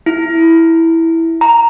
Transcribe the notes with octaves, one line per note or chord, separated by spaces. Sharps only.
E4
A#5